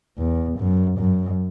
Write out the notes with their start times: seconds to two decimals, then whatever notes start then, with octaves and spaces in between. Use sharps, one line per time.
0.18 E2
0.59 F#2
0.99 F#2